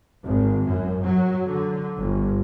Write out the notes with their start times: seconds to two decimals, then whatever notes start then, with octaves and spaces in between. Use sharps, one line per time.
0.24 G#1
0.65 F#2
1.04 F#3
1.47 D3
1.98 G1